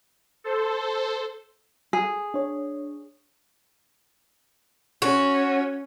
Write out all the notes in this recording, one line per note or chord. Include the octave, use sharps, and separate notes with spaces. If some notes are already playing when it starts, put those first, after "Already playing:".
A4 C5
G#4
D4 C#5
C#4 F#4